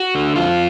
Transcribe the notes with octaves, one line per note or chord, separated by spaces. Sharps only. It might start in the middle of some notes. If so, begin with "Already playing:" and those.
Already playing: F#4
D3
F2 F4